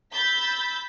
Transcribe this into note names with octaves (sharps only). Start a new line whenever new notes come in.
B5 E6 G6 A6 B6